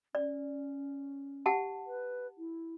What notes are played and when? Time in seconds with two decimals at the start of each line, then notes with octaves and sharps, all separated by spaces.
0.15 C#4 D5
1.46 G4 F#5 A5
1.86 B4
2.38 E4